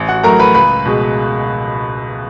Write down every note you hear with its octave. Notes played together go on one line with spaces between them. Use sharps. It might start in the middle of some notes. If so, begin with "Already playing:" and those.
Already playing: A1
F#4 F#5
A2 F#3 A3 A#4 A#5
B4 B5
C#2 B4 B5
B2 G#3